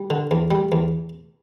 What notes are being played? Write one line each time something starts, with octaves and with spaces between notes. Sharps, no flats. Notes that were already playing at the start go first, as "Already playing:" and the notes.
Already playing: G3
D3
E2
G3
E2